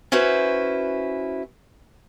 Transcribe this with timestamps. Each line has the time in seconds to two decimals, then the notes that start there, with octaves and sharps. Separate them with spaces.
0.12 C#4 E4 F#4 B4 C5